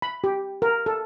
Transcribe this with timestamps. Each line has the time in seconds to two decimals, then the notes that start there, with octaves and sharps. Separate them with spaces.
0.02 B5
0.24 G4
0.62 A#4
0.86 A4